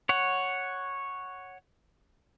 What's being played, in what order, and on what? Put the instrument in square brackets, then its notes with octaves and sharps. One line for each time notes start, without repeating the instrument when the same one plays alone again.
[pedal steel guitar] C#5 F#5